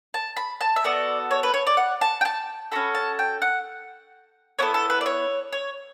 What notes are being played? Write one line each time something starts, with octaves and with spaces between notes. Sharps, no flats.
A5
B5
A5
E5
B3 F#4 A4 D5
C#5
B4
C#5
D5
F#5
A5
G5
A5
C#4 F#4 A4 B5
A5
G5
F#5
B3 E4 A4 C#5
A4
B4
D5
C#5
C#5